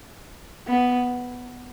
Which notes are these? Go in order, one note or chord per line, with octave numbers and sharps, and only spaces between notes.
B3